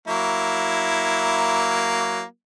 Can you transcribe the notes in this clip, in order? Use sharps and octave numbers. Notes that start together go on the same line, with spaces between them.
F#3 A#3 E4